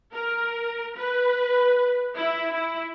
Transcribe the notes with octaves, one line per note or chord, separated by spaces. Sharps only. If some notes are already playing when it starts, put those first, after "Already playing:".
A#4
B4
E4
E4